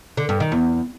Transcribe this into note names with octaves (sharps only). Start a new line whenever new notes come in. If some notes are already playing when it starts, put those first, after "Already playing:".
D3
G2
D#3
E2